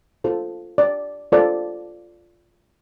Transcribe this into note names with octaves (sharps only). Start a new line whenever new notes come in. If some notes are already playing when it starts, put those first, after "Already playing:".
F4 A4 C5
D5
F4 A4 C5 D5